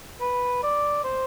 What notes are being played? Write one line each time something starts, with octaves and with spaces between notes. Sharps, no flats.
B4
D5
C5